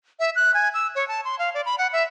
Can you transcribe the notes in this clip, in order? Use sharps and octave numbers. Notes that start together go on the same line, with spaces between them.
E5
F#6
G#5
E6
C#5
A5
C6
F5
D5
B5
F#5
E5